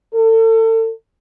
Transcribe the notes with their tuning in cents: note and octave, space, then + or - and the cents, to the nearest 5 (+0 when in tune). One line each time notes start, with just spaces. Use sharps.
A4 +35